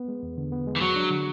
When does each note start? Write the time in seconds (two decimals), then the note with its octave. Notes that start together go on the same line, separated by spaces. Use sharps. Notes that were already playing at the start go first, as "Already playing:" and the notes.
Already playing: B3
0.08 G#3
0.23 E2
0.37 D3
0.52 B3
0.67 G#3
0.76 E3
0.81 F#3 F#4
0.96 D4
1.11 D3